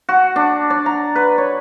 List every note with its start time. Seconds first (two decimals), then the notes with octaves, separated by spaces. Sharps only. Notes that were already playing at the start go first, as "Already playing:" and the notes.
0.09 F#4
0.36 D4
0.70 D5
0.86 A#5
1.15 B4
1.38 C#5